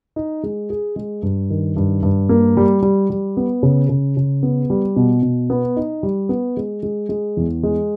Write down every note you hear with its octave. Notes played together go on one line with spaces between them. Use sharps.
D#4
G#3
G#4
G#3
G2
D#3
G2
G2
A#3
G3
G3
G3
B3
C#3
C#3
C#3
B3
G3
B2
B2
B3
D#4
G3
B3
G#3
G#3
G#3
E2
G#3